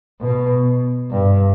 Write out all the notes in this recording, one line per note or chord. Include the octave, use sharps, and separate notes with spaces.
B2
G2